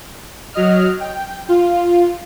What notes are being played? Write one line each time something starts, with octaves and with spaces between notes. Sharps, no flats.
F#3 D#5 F6
G5
F4